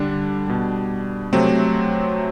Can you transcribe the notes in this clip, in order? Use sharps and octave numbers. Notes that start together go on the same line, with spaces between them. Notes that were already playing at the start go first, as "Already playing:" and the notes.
Already playing: D3 G3 D4
B2 G3
C3 F#3 A3 C4